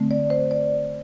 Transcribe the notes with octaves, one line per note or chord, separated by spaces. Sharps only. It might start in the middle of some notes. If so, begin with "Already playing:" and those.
Already playing: D3 A3 C4
D5
C5
D5